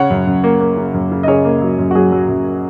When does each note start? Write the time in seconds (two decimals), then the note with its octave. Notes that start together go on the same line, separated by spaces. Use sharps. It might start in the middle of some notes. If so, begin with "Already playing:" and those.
Already playing: C#3 C#5 F#5
0.10 F#2
0.27 F#2
0.44 A#3
0.60 A#3
0.77 C#3
0.94 F#2
1.12 C#3
1.23 D#5
1.27 C#3 G#4 C#5
1.45 A#3
1.61 F#3
1.79 F#2
1.91 F#4
1.95 F#3 G#4
2.12 F#3
2.29 F#2